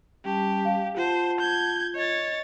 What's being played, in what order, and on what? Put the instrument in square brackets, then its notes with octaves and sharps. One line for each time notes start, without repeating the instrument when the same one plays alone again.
[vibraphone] G3 C#4 A5 [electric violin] G4
[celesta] F5
[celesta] F4 [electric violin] C5 [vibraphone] F#5 A5
[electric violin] G6 G#6
[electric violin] C#5 A6 [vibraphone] D#5